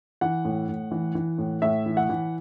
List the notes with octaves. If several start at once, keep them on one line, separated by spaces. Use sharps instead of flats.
E3 F#5
A2
A2
E3
E3
A2
A2 E5
E3
F#5
E3